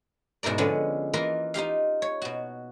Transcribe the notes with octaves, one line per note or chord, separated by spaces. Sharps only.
G#2 B2 E4 A#4 D5
D3 F3 G#3 B3 C#4
E3 A#3 F4 A#4 B4 D#5
D#4 F4 G4 F5
C#5
B2 F#4